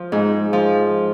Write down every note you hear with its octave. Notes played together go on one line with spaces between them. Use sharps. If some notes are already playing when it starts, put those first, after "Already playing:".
Already playing: F3
G#2
F3